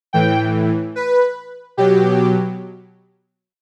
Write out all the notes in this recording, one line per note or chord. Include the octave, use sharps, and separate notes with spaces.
A2 E3 G5
B4
B2 F#3 G4